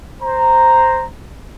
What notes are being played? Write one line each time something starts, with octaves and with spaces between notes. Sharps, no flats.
C5 A#5